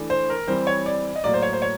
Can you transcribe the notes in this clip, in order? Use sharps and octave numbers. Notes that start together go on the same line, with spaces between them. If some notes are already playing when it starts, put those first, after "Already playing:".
Already playing: E3 A3 D4
C5
A#4
E3 G3 C4 C5
C#5
D5
D#5
A2 F#3 A#3 D5
C5
C#5
C5
C#5